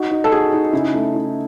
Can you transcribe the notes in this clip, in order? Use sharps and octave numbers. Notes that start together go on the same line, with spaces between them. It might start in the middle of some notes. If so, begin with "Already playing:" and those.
Already playing: D#4 F#4
D#4
A4
F#4 G#4
D#4
C#3 E4
A3
D#4